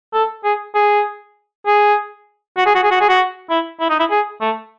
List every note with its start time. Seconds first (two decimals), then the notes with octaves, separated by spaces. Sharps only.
0.14 A4
0.44 G#4
0.75 G#4
1.67 G#4
2.57 F#4
2.66 G#4
2.75 F#4
2.83 G#4
2.91 F#4
3.01 G#4
3.09 F#4
3.50 E4
3.80 E4
3.90 D#4
4.00 E4
4.11 G#4
4.41 A3